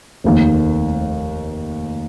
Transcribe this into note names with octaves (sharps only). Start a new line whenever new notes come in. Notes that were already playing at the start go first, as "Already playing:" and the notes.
F1 D#2 D#3